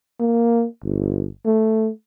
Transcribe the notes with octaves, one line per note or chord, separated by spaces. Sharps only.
A#3
G1
A3